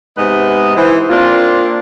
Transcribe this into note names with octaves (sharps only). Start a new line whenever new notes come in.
G#2 C3 B3 B4 D#5
E3 C5
A#3 C4 D4 F4